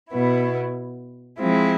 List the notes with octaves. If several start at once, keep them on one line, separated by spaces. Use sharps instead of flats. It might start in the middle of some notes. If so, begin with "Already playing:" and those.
B2 B3 E4
F3 G#3 C4 E4